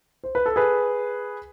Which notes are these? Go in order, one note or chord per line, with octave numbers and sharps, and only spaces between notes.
C5
B4
A4
G#4 B4